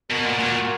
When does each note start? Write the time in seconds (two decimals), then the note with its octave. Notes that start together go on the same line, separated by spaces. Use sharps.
0.10 B2 F#4 A#4
0.25 A#2
0.40 A#2